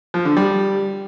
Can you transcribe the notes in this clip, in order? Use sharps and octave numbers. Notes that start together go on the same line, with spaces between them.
F3
D3
G3